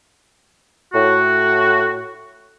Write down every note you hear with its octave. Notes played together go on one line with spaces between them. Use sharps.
A2 F#4